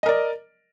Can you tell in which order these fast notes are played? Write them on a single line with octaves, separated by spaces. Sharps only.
D#5 A#4 D5